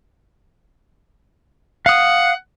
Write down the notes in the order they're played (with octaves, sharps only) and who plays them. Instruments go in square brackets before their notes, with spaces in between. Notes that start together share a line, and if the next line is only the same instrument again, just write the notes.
[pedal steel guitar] F5 D#6 [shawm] F#5